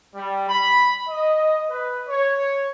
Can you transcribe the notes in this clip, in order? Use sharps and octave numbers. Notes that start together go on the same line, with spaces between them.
G3
B5
D#5
B4
C#5